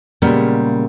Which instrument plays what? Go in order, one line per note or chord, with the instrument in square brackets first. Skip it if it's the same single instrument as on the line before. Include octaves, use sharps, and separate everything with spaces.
[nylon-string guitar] A#2 C#3 G3 G#3 A#3 B3